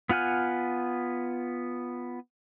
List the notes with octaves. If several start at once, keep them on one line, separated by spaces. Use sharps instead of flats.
B3 F4 F#5 G#5 F6